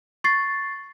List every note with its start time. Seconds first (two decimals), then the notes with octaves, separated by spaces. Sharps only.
0.24 C#6 A6 C7